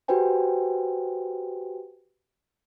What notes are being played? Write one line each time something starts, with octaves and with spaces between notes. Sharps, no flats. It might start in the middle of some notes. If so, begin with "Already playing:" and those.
F#4 G4 B4 C5 G5 G#5